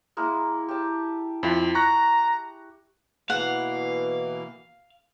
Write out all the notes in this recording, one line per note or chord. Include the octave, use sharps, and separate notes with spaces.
G#3 A#3 E4
G4 A5
F2 E4 F4
A#5 C#6 F#6 A#6
B2 E3 A#3 F5 F#5